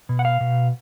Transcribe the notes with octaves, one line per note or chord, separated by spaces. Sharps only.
B2
F#5
F5
B2